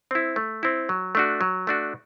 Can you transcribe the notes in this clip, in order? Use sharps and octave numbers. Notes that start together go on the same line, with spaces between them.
C4 E4
A3
C4 E4
F#3
A3 D4 F#4
F#3
A3 D4 F#4